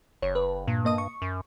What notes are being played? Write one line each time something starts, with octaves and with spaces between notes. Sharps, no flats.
F#1 C#5
B4
G2 A#2
A#3 D#5 D#6
C#6
F#2